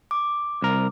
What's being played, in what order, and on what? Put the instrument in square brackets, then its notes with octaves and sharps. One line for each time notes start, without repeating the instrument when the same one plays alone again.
[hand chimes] D6
[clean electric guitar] C2 A#4